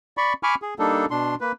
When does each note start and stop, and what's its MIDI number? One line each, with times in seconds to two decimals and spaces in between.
0.17 0.33 74
0.17 0.33 83
0.17 0.33 85
0.43 0.55 80
0.43 0.55 83
0.43 0.55 85
0.43 0.55 86
0.43 0.55 89
0.62 0.74 68
0.79 1.06 55
0.79 1.06 58
0.79 1.06 62
0.79 1.06 63
0.79 1.06 69
1.11 1.35 47
1.11 1.35 62
1.11 1.35 84
1.41 1.52 58
1.41 1.52 71